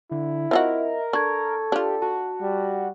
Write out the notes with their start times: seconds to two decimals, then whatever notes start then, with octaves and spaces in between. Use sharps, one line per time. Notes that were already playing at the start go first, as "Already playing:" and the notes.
0.11 D3 E4
0.51 C4 F4 F#4 A#4 D#5 E5
1.13 D4 A4 C#6 G#6
1.72 D4 F4 G4
2.02 F#4 A5
2.42 G3